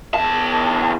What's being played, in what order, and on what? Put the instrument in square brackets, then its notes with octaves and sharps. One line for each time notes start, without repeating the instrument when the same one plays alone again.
[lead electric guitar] E2 A5